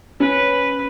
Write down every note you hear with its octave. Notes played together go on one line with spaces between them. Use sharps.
C#4 B4